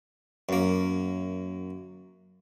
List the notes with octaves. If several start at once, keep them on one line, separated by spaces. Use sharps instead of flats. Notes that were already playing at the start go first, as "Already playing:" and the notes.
F#2 A#3